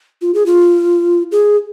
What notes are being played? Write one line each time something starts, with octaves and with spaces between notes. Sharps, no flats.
F4
G#4
F4
G#4